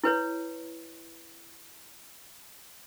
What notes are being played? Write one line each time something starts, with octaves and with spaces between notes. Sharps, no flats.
E4 B4 C#5